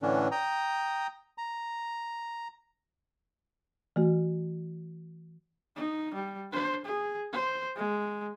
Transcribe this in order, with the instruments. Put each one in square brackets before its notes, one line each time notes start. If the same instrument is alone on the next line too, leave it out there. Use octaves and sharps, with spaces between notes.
[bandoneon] A2 D3 E3 C#4 D4
G5 A#5 D#6
A#5
[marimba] E3 A3 F#4
[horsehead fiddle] D#4
G3
D4 C5
G#4
C5
G#3